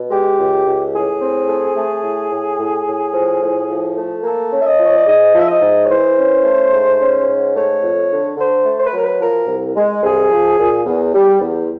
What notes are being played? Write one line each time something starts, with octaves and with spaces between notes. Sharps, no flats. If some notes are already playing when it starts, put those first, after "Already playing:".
Already playing: B2
G#3 G4
C#2
C#2
A2 G#4
C4
A3
A3
A2
A2
A2
A2
F3
A2
F3
A3
A#3 A4
C#4
E5
D#5
F3
C#5
D5
G#2 D#5
F3
E5
D#5
G#2
C#5
E3 C5
C#4
A3
G#2
C#4
G#2
A3 C#5
F2
D3
D3 C5
A3
C5
B4
F#3 A#4
B4
F3 A#4
C2
G#3
C2 G#4
F3
A#2
E2
G3
E2